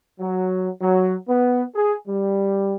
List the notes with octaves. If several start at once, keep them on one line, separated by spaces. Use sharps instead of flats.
F#3
F#3
B3
G#4
G3